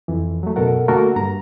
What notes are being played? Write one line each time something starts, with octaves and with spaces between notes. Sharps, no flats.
F2 E3
F#3 A3
F#2 B2 A4 A#4 F#5
D3 A3 A#3 F#4 A4 A#4
G2 A#5